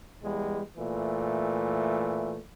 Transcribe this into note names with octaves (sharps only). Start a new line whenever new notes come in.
E2 G3 G#3
A#2 E3 A3